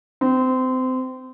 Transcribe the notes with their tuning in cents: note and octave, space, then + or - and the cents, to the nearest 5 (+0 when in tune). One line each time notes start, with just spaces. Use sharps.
C4 -25